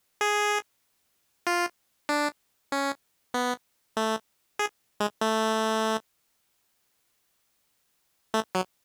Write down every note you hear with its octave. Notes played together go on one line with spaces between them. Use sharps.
G#4
F4
D4
C#4
B3
A3
G#4
G#3
A3
A3
F#3